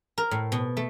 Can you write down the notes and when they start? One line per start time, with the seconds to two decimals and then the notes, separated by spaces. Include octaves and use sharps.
0.18 A#4
0.31 A2
0.52 B2
0.77 A3